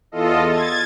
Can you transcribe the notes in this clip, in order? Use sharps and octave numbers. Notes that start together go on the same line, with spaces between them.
E2 F4 A4 D#5
G#6 A6